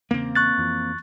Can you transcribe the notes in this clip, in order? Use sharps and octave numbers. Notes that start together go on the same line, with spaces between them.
E2 C#3 A#3 C4
C#6 F#6 A6
F2 E3 F3